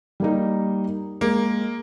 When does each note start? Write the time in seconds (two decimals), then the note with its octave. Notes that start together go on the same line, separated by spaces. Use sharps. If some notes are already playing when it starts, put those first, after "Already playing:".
0.20 G3 A#3 D#4
1.21 G#3 A#3